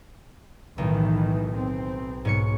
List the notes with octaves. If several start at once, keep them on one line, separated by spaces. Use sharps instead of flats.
B1 A2 D#3 E3
C4
B1 G#2 C#5 C#7